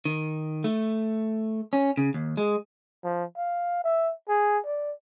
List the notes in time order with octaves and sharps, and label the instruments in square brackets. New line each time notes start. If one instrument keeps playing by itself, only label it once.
[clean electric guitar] D#3
A3
C#4
C#3
D#2
G#3
[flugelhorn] F3
F5
E5
G#4
D5